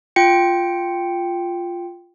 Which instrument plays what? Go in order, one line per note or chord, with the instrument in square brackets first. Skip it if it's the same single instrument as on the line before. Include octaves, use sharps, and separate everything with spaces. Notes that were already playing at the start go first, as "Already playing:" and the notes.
[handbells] F4 G5 C#7